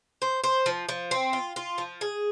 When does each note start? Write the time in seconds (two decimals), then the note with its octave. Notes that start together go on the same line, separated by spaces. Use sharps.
0.22 C5
0.44 C5
0.66 F3
0.89 F3
1.11 C4
1.33 F4
1.56 F4
1.78 F3
2.01 G#4